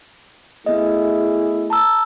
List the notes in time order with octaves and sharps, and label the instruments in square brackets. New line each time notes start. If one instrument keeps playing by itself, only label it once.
[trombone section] A3 E4 G#4 [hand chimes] B3 D#5
[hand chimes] A5 A#5 E6